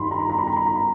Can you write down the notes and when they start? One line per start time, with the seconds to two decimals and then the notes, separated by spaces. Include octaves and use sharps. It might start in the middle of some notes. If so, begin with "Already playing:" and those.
Already playing: G2 D#3 B5 C6
0.11 A#5
0.20 B5
0.30 A#5
0.39 B5
0.47 A#5
0.56 B5
0.66 A#5
0.75 B5